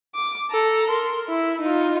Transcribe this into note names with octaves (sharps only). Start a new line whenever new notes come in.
D6
A4 A#5
A#4 C6
E4
D#4 F4